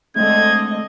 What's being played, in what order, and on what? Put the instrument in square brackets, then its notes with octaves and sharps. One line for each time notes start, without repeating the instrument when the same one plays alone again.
[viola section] D3 C4 D#5 [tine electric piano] G#3 A3 [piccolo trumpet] G#6